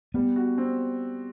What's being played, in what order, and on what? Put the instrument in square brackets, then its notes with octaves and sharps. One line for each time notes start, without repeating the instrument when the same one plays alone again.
[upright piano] G3 [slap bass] B3
[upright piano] F#4
C4